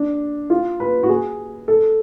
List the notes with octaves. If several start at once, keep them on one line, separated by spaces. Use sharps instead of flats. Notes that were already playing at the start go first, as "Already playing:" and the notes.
Already playing: D4
F4
B4
F#4
G#4
A4